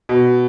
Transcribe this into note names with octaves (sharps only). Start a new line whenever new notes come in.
B2